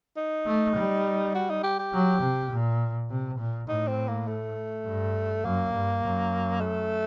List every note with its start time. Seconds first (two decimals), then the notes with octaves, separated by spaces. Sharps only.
0.17 D#4
0.47 A3
0.76 G3
1.35 F#4
1.50 D#4
1.63 G4
1.79 G4
1.93 F#3
2.22 C3
2.52 A#2
3.10 C3
3.40 A#2
3.69 A2 D#4
3.88 C4
4.08 A#3
4.27 A3
4.86 G2
5.44 F#2 A#3
5.74 G2
6.03 F#2
6.61 A3